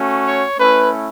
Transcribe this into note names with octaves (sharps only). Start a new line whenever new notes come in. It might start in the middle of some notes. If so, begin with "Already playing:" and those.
Already playing: A3 C#4 F#4
C#5
A3 C#4 E4 B4